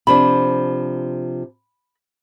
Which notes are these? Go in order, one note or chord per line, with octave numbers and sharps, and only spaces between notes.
C3 F3 D4 B5